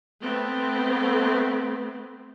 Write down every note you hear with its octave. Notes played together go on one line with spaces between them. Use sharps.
A3 B3 C4